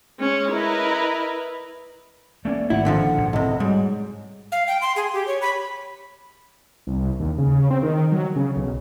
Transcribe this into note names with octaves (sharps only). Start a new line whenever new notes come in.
G#3 C#4
E4 A#4 B4 D#5
A3 A#3 C#4 D5
G#1 C3 D#3 E4 F#5
A#2 D3 F3
A#1 G#2
A2 C3 D#5
G#2 F#3 G3
F5
G5
C6
G#4
G4
C#5
B5
C2
D#2
C#3
C4
D#3
F#3
C#3
B1